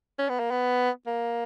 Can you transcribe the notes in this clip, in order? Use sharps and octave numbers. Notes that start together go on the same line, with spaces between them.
C#4
B3
A#3
B3
A#3